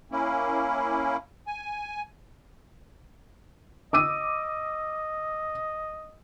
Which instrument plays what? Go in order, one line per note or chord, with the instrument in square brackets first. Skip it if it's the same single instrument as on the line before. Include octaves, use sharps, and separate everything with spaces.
[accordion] A#3 C#4 E4
G#5
[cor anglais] D#5 [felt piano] D6 E6 D#7